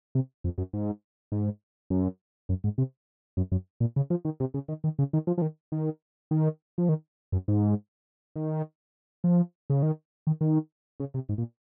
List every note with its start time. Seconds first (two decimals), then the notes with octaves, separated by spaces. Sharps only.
0.15 C3
0.44 F2
0.58 F#2
0.73 G#2
1.32 G#2
1.90 F#2
2.49 F#2
2.64 G#2
2.78 C3
3.37 F#2
3.52 F#2
3.80 A#2
3.96 C#3
4.10 F3
4.25 D#3
4.40 C3
4.54 C#3
4.68 D#3
4.84 D#3
4.99 C#3
5.13 D#3
5.27 F3
5.38 F3
5.42 D#3
5.72 D#3
6.31 D#3
6.78 F3
6.89 D#3
7.32 F#2
7.48 G#2
8.36 D#3
9.24 F3
9.70 C#3
9.83 D#3
10.27 D#3
10.41 D#3
11.00 C#3
11.14 C3
11.29 G#2
11.38 A#2